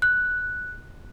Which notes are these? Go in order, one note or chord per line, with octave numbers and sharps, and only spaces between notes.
F#6